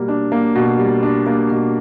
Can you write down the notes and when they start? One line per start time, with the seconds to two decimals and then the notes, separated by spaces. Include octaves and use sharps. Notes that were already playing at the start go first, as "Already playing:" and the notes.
Already playing: B2 G3 A#3
0.08 D4
0.32 A#3
0.55 B2
0.79 G3
1.03 D4
1.27 A#3
1.50 B2